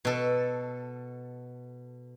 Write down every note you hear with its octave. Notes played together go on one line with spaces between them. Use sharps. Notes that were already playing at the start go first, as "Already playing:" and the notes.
B2 A4